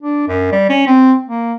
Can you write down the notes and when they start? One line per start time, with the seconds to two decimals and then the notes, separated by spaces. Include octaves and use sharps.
0.02 D4
0.28 F#2
0.52 G3
0.69 C#4
0.87 C4
1.28 A#3